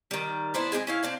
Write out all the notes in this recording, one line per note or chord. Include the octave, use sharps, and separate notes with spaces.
D#3 G3
B3 C4 D4 E4
G#3 C4 E4 G#4
C#4 E4 F5
C4 D4 F5